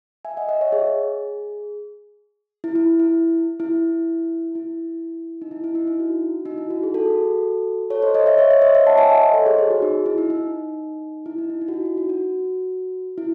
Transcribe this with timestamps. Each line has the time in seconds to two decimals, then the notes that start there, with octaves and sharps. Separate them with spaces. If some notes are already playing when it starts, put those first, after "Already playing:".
0.25 E5 G#5
0.37 D#5 F#5
0.49 D#5 F#5
0.61 C#5 E5
0.72 G#4
2.64 E4
2.75 E4
2.99 E4
3.60 E4
4.55 E4
5.42 D#4
5.51 E4
5.64 E4
5.75 D#4
5.87 E4
6.00 F#4
6.45 D#4
6.58 E4
6.70 F#4
6.83 G#4
6.94 F#4 A4
7.90 A4 C#5
8.02 C5 D#5
8.14 C5 D#5
8.26 C#5 E5
8.38 C#5 E5
8.51 C#5 E5
8.62 C5 D#5
8.74 C#5 E5
8.87 F#5 A5
8.98 E5 G#5
9.10 D#5 F#5
9.22 C5 D#5
9.34 A4 C#5
9.46 G#4 C5
9.58 G#4
9.70 F#4
9.82 D#4
10.06 E4
10.18 D#4
10.30 D#4
11.26 E4
11.38 D#4
11.50 E4
11.61 D#4
11.68 F#4
11.73 E4
11.85 F#4
11.97 F#4
12.09 F#4
13.18 E4